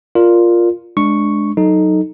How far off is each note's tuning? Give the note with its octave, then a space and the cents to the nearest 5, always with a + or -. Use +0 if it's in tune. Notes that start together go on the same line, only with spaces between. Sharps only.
F4 +0 A#4 +0 D5 +0
G#3 +20 D4 +0 C#6 +0
F#3 +0 D#4 +0 A4 +0